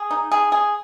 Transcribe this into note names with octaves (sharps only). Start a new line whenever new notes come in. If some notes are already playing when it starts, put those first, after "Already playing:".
Already playing: G#4
D#4
G#4
G#4